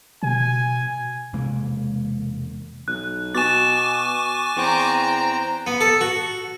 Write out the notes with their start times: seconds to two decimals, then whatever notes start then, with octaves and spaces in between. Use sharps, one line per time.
0.23 B2 G#5
1.33 E1 C3 G#3 A#3
2.88 B1 F#6
3.35 B2 G#5 C#6 D6 A6 E7
4.56 E2 C4 A#5
5.67 B3
5.81 A4
6.01 F#4